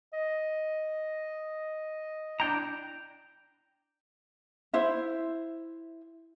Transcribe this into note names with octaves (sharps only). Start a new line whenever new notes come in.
D#5
D4 E4 G5 A#5
E4 C5 E5